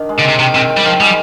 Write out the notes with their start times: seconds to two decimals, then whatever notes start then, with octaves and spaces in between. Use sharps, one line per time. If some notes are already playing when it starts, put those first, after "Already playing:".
Already playing: D#3 D4
0.09 G#3
0.19 D3
0.24 C3 C4
0.39 C3 D#3
0.55 C3 C4
0.70 C4
0.77 G3
0.85 D#3 F3
1.00 G3 G#4